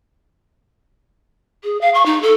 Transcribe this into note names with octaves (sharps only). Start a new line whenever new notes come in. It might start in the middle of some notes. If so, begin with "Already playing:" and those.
G#4
F5
C#6
D#4
A4